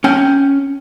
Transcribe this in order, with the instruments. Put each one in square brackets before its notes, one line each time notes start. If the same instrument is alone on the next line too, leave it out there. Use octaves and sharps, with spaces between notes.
[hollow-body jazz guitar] C#4 G5